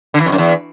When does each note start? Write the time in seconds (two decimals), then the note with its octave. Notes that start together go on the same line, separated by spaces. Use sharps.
0.14 D3
0.20 E3
0.26 F2
0.32 F#2
0.38 E2